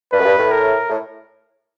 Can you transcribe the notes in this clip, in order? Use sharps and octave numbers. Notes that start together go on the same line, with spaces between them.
G2 B4
F#2
G2
A2
A#4
A2